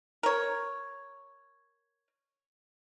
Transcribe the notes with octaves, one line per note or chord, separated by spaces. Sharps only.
A#4 C#5